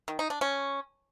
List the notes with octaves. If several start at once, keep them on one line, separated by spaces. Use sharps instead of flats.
D#3
D#4
D4
C#4